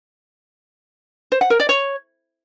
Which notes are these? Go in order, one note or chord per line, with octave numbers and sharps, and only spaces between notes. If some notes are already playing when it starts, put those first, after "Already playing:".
C5
F#5
A#4
D5
C#5